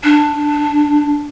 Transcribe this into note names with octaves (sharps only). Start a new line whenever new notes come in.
D4